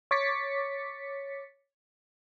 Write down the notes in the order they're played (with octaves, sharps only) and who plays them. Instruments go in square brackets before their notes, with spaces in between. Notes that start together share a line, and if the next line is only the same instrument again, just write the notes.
[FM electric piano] C#5 D6 A6 B6 C#7